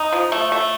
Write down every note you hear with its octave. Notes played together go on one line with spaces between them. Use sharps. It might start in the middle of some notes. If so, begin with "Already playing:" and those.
Already playing: D#4
F3
A3
A3